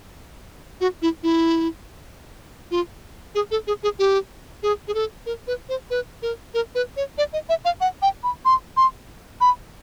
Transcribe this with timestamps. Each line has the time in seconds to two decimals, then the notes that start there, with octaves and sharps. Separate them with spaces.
0.81 F#4
1.02 E4
1.23 E4
2.71 F4
3.35 G#4
3.51 A4
3.67 G#4
3.83 G#4
3.99 G4
4.63 G#4
4.88 G#4
4.94 A4
5.26 A#4
5.47 B4
5.69 C5
5.90 B4
6.22 A#4
6.54 A#4
6.75 B4
6.97 C#5
7.18 D5
7.33 D#5
7.49 E5
7.65 F5
7.81 F#5
8.02 G5
8.23 B5
8.45 C6
8.77 C6
9.41 B5